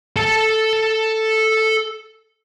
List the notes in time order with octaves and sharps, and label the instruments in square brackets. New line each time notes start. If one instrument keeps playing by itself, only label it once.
[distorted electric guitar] A4 A5